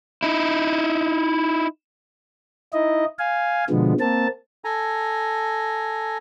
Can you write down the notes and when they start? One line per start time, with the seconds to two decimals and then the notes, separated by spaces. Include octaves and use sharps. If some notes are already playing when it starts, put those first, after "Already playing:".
0.23 D#4 E4
2.73 D#4 E4 D#5
3.19 F5 G#5
3.70 B2 D3 F3 G#3 B3
4.00 A#3 C4 A5
4.64 A4 G#5 A#5